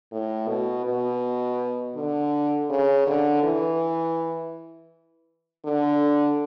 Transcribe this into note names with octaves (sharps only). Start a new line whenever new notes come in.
A2
B2
B2
D3
C#3
D3
E3
D3